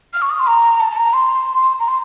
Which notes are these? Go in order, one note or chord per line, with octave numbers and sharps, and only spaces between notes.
F6
C#6
D#6
C6
A#5
A5
A5
A#5
C6
A#5
C6